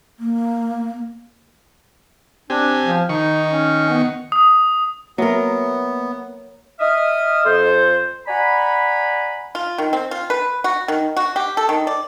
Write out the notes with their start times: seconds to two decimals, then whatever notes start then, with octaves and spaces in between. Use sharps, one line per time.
0.19 A#3
2.50 C4 D4 G4 G#5
2.85 F3
3.09 D#3 D#4 C#6
3.51 C#4
3.89 B3
4.32 D#6
5.18 F#3 A#3 B3 F#4 A#4 E5
6.80 D#5 E5 D#6 F6
7.45 F2 A4 C5
8.27 D5 F#5 G#5 A#5 B5
9.55 F4
9.78 D#3
9.93 C4
10.11 F4
10.30 B4
10.64 F#4
10.88 D#3
11.17 F#4
11.36 G4
11.57 A4
11.69 D#3
11.87 D5